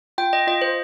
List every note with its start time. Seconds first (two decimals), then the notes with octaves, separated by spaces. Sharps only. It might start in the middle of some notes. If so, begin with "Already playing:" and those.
0.18 F4 G5
0.33 D#5
0.47 F4 D#5
0.62 C5